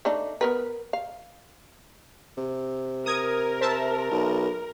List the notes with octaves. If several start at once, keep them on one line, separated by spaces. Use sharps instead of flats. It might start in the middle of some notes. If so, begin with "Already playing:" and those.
A3 D4 D#4
B3 A#4 B4
F5
C3
A#4 D#6 G#6
C5 E5 A5
B1